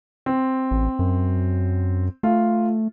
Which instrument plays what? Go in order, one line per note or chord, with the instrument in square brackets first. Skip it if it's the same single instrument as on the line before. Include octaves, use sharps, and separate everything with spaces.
[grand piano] C4
[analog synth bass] A1
F#2
[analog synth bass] A3 [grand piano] F4